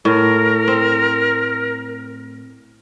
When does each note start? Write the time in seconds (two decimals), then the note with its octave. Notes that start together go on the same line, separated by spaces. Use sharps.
0.05 A2 A#4
0.68 C4